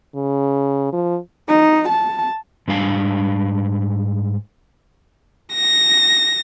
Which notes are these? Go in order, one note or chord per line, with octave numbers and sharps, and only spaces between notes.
C#3
F3
D#4
A5
G#2 G3 D4 F5 G#5
A#6